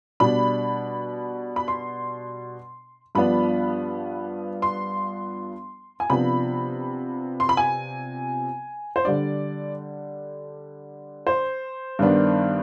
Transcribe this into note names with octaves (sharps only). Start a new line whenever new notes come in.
B2 G3 D4 B5
B5
C6
G2 F3 B3 D4 B5
C6
G#5
C3 F3 B3 D4 B5
C6
B5
G#5
C5
D3 G3 D4 D5
C5
G2 D#3 B3 D4